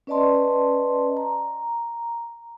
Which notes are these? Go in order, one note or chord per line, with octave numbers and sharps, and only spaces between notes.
C#4 B4 D5 D#5 A5 C6
A#5